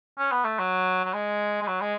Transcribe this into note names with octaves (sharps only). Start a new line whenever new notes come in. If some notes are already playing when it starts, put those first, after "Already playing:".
C#4
B3
A3
F#3
F#3
G#3
G#3
F#3
G#3